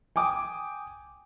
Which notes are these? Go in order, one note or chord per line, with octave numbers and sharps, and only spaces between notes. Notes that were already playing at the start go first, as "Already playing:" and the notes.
G5 G#5 D6 D#6